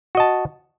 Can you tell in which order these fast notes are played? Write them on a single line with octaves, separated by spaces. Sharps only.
F#4 D#5 A5